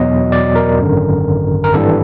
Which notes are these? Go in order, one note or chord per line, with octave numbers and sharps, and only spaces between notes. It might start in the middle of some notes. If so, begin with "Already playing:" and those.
Already playing: E2 B2 F#3 D#5
D5
A#4
G#1 F#2 D3
A#4
G#1 G2 E3 G3 A4